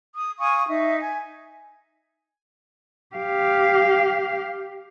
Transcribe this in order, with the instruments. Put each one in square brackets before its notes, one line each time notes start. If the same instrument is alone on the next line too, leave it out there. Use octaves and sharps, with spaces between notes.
[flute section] D#6
F5 G#5 C#6 D#6
D#4 E5
G#5
[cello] G4 F5